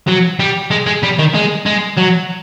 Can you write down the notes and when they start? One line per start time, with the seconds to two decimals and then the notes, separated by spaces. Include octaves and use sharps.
0.08 F#3
0.40 G3
0.71 G#3
0.86 G#3
1.03 G3
1.18 D#3
1.34 G#3
1.66 G#3
1.97 F#3